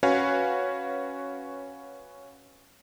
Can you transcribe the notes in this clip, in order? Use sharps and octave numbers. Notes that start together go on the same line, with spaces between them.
C#4 F#4 B4 C#5 F5 G#5